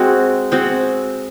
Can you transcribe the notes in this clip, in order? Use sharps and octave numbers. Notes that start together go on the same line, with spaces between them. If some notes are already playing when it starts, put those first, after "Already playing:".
Already playing: G#3 C4 F#4
G#3 C4 F#4